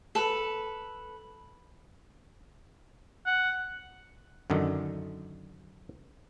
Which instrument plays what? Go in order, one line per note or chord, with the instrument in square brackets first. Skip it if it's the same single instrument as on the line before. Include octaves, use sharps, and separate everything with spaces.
[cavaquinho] A4 B4
[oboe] F#5
[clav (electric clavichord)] F#2 D3 D#3